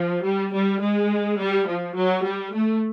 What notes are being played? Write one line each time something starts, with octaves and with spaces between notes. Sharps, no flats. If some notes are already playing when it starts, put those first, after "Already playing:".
Already playing: F3
G3
G3
G#3
G3
F3
F#3
G3
A3